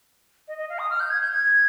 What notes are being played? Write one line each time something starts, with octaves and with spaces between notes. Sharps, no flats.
D#5
D#5
F5
D#6
F6
G6
G#6
G6
G#6